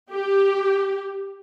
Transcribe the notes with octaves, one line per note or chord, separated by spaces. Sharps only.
G4